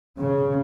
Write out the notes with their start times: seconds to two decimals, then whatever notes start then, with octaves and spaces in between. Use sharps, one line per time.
0.20 C#3